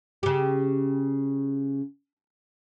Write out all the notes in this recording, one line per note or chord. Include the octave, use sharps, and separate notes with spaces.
C#3 G4